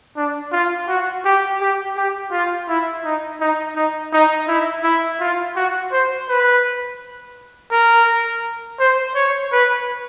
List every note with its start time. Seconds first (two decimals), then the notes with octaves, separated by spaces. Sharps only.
0.17 D4
0.52 F4
0.88 F#4
1.25 G4
1.61 G4
1.97 G4
2.32 F4
2.68 E4
3.05 D#4
3.40 D#4
3.76 D#4
4.13 D#4
4.48 E4
4.84 E4
5.20 F4
5.56 F#4
5.92 C5
6.29 B4
7.72 A#4
8.80 C5
9.15 C#5
9.52 B4